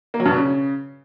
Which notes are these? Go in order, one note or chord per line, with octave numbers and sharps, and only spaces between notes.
A#3
F#3
G2
B2
C#3